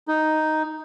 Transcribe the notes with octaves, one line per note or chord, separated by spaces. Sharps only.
D#4